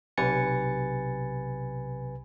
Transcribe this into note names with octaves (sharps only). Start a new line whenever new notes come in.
B1 C3 B4 G#5 A6 C#7